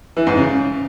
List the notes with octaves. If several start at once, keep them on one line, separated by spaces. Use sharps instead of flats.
E3
G#2
C#3